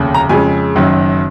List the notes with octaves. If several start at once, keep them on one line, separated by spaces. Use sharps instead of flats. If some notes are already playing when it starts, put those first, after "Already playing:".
Already playing: F1 D#2 C#3
A#5
F2 C#3 G#3 G#5
F#1 F#2 D#3 F#3